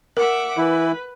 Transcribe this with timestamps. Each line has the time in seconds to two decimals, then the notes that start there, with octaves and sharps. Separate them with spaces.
0.17 A#4 E5 F#5 D6
0.57 E3 E4 B4